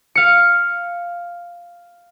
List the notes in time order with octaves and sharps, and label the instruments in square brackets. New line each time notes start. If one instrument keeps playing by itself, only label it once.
[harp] F5 C#7